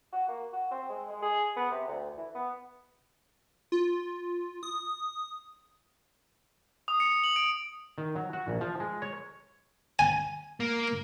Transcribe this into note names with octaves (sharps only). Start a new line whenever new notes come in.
F#4
A#3
F#4
C4
G#3
G#3
G#4
B3
C3
D2
E3
B3
F4
D#6
D#6
C#7
F#7
D7
D#3
F#3
F#4
A#1
F3
G#3
C#5
G#5
A#3